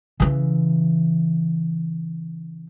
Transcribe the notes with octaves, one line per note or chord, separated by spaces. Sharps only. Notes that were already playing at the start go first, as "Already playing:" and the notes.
C#3 E3